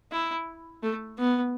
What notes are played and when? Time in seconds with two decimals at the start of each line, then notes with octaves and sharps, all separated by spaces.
0.12 E4
0.83 A3
1.18 B3